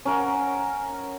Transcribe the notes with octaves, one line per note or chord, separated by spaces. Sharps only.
C#4 A#4 F#5